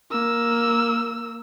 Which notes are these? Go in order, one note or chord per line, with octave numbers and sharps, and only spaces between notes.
A#3 E6